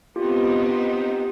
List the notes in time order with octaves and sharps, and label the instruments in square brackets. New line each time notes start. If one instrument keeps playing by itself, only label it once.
[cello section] B3 C4 D#4 [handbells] F4 G4